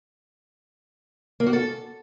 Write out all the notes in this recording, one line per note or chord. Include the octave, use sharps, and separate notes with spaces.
A#3
F#4
A4